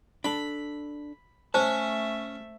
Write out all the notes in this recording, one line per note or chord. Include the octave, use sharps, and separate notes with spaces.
D4 A4 B5
A3 C#4 C5 E5 A5